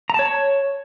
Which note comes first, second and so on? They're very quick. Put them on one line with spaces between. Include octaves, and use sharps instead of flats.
A#5 A5 C#5